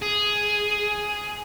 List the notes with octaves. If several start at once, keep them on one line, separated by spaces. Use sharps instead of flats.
G#4